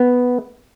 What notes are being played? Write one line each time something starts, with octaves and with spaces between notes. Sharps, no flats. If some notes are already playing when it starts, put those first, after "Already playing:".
Already playing: B3